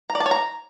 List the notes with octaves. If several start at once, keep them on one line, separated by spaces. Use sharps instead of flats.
A#5
D5
A5
C#5
A#5